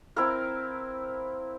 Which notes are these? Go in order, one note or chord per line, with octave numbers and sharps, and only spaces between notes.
C4 E4 A#4 F5